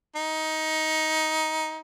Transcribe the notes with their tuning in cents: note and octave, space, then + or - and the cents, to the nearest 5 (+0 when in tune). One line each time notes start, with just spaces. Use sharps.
D#4 +15